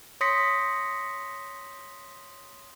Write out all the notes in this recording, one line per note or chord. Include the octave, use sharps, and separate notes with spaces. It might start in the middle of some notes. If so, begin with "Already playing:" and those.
C#5 C6 D#6 A#6 B6 C#7